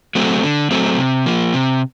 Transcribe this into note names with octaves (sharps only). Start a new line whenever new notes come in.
F#3 A3 C4
D3
F#3 A3 C4
C3
F3 A#3
C3